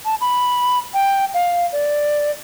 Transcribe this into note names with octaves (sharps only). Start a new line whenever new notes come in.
A5
B5
G5
F5
D5